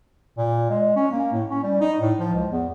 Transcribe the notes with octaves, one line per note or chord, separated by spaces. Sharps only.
A#2
G#3
C#4
A#3
A2
C#4
G3
D#4
A2
F3
C#2
E2